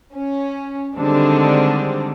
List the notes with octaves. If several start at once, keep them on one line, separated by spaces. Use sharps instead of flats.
C#4
D3 D#3 G3 G#3 C4 D4